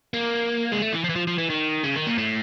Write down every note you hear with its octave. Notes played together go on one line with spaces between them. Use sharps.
A#3
G#3
A3
E3
F3
E3
F3
F3
E3
D#3
C#3
D#3
A#2
A2